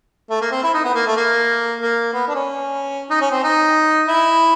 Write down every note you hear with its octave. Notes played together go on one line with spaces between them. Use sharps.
A3
A#3
C4
E4
D#4
B3
A#3
A3
A#3
A#3
B3
D4
C#4
D#4
C#4
C4
D#4
E4